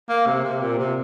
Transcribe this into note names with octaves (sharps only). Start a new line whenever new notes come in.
A#3
C3
C3
A#2
C3